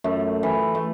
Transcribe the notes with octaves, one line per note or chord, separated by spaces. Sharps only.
F#2 A3
E3
A3